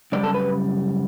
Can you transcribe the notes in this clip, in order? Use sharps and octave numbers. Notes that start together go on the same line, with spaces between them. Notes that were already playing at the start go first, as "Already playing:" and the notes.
F#2 C#3 G3 D5
A4
B4